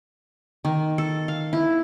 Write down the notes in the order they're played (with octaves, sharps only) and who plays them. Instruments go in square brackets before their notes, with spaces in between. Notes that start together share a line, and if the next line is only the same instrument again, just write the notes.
[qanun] D#3
A4
F5
E4